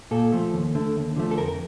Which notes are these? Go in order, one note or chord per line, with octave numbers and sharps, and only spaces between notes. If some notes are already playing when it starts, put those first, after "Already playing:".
A#2 A4
F3 A3
D#2
D3 A3
D#2
D3 F3 A3
A4
F2 A#4
A#4